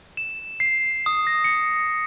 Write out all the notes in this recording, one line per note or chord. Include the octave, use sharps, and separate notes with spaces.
E7
C7
D#6
A#6
C#7